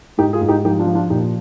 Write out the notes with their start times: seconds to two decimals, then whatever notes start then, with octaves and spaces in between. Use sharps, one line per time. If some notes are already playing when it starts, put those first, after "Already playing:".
0.18 G#2 D#4 G4
0.33 F4 G#4
0.41 G#2
0.48 D#4 G4
0.65 F3 D#4 G4
0.79 D4 F4
0.87 F3
0.95 D4 F4
1.10 A#2 D#4 G4